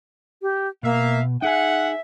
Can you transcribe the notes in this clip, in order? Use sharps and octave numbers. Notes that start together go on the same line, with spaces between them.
G4
B2 A#3 E5 F5
D#4 G#4 E5 F#5 G#5